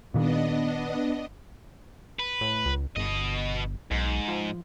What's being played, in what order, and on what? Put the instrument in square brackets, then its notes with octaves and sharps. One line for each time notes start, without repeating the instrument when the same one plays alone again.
[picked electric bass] A#2 D#3 [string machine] B3 D4 D#5
[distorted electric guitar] B4
[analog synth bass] A2
C#2
[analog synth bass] G1 [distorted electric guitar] B2 D#5
[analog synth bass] B1 [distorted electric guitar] G#2
[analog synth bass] F3